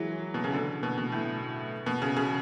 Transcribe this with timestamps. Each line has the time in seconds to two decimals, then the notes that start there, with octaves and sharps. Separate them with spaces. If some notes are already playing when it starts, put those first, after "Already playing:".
Already playing: E3 F#3 G#3
0.34 B2
0.44 C#3
0.53 D3
0.83 B2
0.98 B2
1.12 A2
1.86 B2
2.02 C#3
2.16 C#3